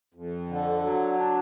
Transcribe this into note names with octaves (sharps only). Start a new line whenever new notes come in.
F2
D3
F#3
D4